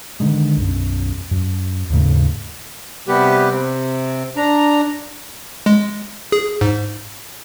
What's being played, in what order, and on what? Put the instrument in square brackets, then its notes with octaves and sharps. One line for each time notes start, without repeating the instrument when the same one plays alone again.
[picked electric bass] D3 D#3 G#3
B1 F#2
F#2
D#2 G#2 C#3 A3
[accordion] C3 G3 B3 G4 B4
C3 C4
D4 A#5
[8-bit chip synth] G#3
G#4
G#2